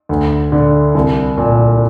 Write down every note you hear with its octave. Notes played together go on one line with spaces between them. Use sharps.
D2
D3
C2
A#2